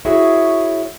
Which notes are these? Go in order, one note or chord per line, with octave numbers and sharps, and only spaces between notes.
E4 F#4 G#4 C#5